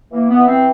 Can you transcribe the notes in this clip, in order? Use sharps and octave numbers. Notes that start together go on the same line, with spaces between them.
E3 A#3
B3
E3
C4